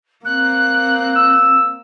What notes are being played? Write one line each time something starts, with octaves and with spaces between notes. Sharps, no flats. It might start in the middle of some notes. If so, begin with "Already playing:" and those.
A#3 C4 F#6
E6